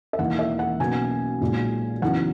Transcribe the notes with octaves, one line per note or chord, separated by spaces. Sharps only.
E5
E1 E2 D#3 A#3 F#5
E5
F#5
B1 B2 A#3 C#4 G#5
B1 A#2 G#3
E2 C#3 F#3 B3 D#4 F#5